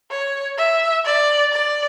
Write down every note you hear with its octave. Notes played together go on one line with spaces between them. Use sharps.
C#5
E5
D5
D5